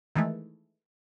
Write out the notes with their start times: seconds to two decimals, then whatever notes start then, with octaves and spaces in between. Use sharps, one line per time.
0.15 D#3 E3 G#3 A3